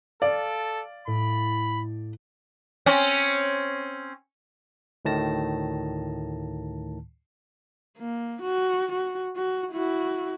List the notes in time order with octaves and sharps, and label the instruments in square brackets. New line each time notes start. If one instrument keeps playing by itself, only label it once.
[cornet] A4 [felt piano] D5 [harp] F5
[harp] A2 [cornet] B5
[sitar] C4 C#4
[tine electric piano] D2 A2 D#3 A5 A#6
[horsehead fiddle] A#3
F#4
F#4
F#4
E4 F#4